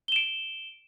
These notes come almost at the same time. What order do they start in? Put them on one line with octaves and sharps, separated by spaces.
G7 E7 D7